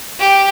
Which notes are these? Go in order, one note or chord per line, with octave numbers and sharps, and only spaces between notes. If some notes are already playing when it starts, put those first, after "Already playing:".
G4